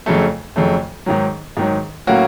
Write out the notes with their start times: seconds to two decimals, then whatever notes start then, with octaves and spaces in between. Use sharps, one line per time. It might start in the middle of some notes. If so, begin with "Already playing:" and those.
0.06 F2 C#3 F#3 A3
0.56 F2 C#3 F#3 A3
1.06 G#2 D#3 F#3
1.57 G#2 D#3 F#3
2.07 A2 F#3 A#3 C#4 F#4